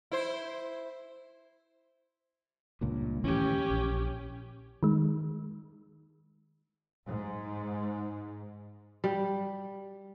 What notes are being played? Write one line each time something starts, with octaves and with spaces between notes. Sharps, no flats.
E4 C5
C#2 G2 A#2
D#2 A2 E3 C#4 G4
A#1
D#3 G#3
G#2
G3